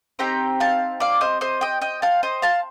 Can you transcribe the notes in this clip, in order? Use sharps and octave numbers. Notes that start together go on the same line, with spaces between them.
C4 D#4 G4 G5 A#5
F5 A5
D5 F5
C5 D#5
C5 D#5
D#5 G5
D#5 G5
F5 A5
C5 D#5
F5 A5